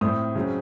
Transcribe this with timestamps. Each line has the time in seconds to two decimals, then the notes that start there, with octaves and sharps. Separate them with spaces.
0.01 A2 A3 C4 D#6
0.35 C#3 F#3 C4